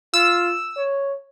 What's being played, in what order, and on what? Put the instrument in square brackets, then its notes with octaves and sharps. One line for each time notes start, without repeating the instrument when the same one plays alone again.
[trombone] F4 [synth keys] E6
[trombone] C#5